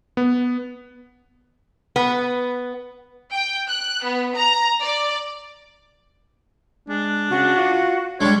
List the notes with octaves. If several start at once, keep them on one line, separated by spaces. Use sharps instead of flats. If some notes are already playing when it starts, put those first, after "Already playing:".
B3
B3
G5
F#6
B3
A#5
D5
G#3 D4
C#3 F#4
F4
G3 G#3 D4 C#5